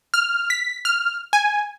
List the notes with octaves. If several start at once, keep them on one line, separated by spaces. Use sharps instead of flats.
F6
B6
F6
G#5